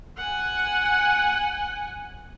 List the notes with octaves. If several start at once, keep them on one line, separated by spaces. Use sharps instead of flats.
F#5 G#5